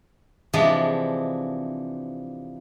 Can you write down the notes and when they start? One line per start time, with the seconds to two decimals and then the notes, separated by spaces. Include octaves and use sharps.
0.53 C3 E3 F3 G#3 D4